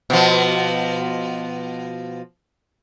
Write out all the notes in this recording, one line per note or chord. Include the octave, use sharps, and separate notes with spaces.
B2 F3